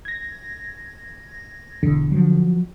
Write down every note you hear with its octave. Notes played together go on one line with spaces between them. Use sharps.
G#6 A#6
E1 E2 D3
F3 F#3